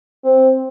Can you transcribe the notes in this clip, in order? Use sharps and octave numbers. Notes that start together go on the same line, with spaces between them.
C4